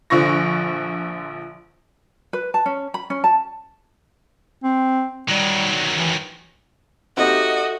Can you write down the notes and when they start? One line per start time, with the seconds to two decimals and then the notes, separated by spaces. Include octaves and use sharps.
0.10 A#1 D3 F3 C#6 A#6
2.33 B4
2.54 A5
2.66 C#4
2.94 B5
3.10 C#4
3.24 A5
4.63 C4
5.29 D#3 F#3 G3
5.96 E3
7.17 C4 D#4 F#4 G4 A4 D#5 E5 F#5